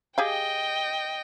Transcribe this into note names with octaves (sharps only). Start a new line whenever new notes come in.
G4 G#4 D#5 F5 G5